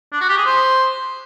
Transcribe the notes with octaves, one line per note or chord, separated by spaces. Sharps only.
D4
F#4
G4
G#4
C5